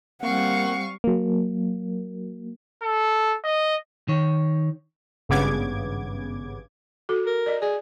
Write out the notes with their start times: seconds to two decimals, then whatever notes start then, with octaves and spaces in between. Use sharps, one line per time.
0.23 G3 A#3 C4 F5 F#5 C#6
1.04 F#3 A#3
2.83 A4
3.44 D#5
4.08 D#3 C#5
5.29 G#1 G2 C#3 B3 D6 G#6
7.09 F#4 A4
7.26 A#4
7.46 D5 D#5
7.62 G#4 D5